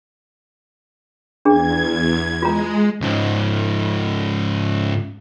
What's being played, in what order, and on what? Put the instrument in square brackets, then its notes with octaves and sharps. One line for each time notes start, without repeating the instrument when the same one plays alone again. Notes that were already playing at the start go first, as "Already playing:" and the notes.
[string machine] E2 G#6 [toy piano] D4 G#4
[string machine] G#3 [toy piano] F4 A#5
[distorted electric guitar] C#2 G#2